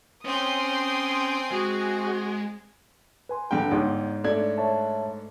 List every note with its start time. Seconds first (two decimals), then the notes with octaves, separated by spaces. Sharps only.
0.25 C4 C#4 G5 G#5 C6 D#6
1.51 G#3 F#4 G#4
3.29 B4 G#5 C6
3.51 G2 D3 G5
3.71 G1 G#2 C#5
4.24 A3 D4 G#6
4.58 C#5 E5 A5